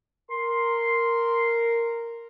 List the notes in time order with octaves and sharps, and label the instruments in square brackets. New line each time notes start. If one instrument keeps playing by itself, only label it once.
[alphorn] A#4 [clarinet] C6